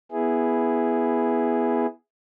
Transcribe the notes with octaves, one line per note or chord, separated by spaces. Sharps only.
B3 E4 G#4